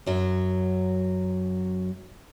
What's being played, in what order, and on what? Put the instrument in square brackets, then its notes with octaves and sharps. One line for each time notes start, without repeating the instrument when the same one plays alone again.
[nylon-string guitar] F#2 F#3